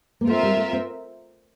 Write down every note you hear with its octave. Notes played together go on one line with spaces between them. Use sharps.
A#3
A3 C4 F4 A#4 E5
G3
A3
C4